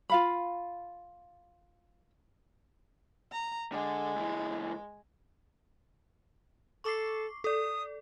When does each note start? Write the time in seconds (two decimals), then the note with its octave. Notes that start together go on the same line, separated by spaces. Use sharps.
0.10 F4 F5 B5
3.32 A#5
3.72 D3 G#3
4.16 C#2 E3
6.84 A4 C#6 D6 C7
7.44 A4 D5 D#6